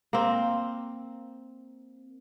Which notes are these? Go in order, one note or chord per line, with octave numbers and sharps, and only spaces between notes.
A#3 C4